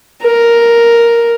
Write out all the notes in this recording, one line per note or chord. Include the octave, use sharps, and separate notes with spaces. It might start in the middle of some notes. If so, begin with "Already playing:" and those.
A#4